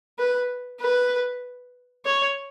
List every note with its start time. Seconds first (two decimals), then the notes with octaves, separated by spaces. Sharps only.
0.19 B4
0.81 B4
2.05 C#5